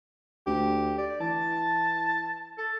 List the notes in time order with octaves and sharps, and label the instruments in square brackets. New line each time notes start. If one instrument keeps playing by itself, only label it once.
[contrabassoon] D2 [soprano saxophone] G4
[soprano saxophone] D5
[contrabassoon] E3 [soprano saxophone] A5
[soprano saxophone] A4